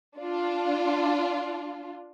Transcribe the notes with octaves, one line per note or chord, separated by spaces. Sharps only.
D4 F4